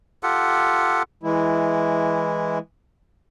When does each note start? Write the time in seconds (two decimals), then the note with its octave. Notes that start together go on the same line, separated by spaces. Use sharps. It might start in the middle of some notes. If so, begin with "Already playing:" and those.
0.23 F4 G4 A4 F#5
1.23 E3 G#3 E4